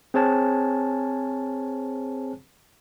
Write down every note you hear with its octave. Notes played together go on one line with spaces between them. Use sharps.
C4 G#4 C5 C#5 G#5 A5